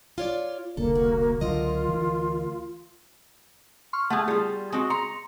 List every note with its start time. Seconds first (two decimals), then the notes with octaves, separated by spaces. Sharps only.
0.18 F4 C#5 D5
0.77 E1 C2 D3 A#3 A4
0.95 F#4
1.41 C#2 D3 F#3 F4 A#4 D#5
1.89 D2 E3
3.93 C6 C#6 F6
4.10 A3 G#4 F#5 A5
4.28 G3 F4 G#4
4.72 G#3 C4 F#4
4.90 A#5 C6 C#7